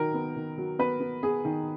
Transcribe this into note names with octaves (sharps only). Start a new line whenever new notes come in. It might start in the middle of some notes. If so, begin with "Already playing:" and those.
Already playing: D#3 F#3 A#4
B3
D#3
F#3
B3 B4
B3
B3 G#4
D#3